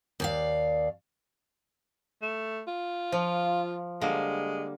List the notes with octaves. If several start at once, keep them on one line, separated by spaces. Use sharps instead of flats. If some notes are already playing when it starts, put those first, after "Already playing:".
D#2 D5 F5
A3
F4
F3
D3 G3 G#3 A#3